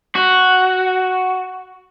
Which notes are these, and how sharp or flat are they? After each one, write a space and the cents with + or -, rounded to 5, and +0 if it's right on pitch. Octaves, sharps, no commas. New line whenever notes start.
F#4 +0